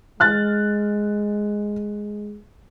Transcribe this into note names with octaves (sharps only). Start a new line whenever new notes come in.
G#3 F6 F#6 A6